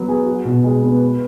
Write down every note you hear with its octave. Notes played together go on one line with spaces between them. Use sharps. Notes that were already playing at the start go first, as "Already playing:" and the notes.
Already playing: F#3 B3
G#4
F#4
B2
G#3
B3
B4